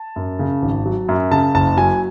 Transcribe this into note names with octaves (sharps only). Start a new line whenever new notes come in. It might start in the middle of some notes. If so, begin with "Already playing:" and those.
Already playing: A5
F#2
C#3
G#1
F#3
F#2
C#3 A5
F#1 A5
F#3 G#5